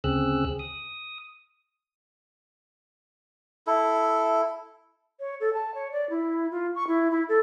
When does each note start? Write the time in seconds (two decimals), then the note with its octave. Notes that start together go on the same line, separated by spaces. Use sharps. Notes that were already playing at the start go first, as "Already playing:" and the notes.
0.04 D2 C#3 C4 G#4 E6 F#6
0.59 D#6
3.67 E4 A4
5.20 C#5
5.40 A4
5.53 A5
5.75 C#5
5.92 D5
6.10 E4
6.51 F4
6.75 C#6
6.87 E4
7.11 E4
7.29 A4